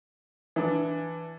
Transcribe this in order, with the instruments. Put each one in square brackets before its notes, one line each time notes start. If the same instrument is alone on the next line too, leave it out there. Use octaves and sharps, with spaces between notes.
[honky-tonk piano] E3 D4